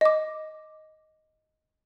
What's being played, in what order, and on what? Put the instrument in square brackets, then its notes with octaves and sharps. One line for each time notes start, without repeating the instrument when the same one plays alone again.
[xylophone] D#5 D6